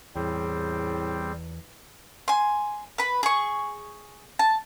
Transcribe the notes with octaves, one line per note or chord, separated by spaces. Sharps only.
E2 A2 G3 C4 G#4
G#5 C6
B4 B5
G#4 C#6
A5